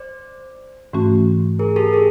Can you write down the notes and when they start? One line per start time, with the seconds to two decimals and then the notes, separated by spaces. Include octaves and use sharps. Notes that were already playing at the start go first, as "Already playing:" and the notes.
Already playing: C5 D5
0.93 G#2 E3 A3 C#4 F#4
1.59 G#4 A#4
1.76 G4 A4
1.93 G#4 A#4